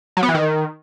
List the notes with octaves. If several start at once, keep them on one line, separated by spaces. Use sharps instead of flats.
F#3
B3
E3
D#3